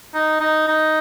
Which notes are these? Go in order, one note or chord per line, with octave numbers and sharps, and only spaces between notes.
D#4
D#4
D#4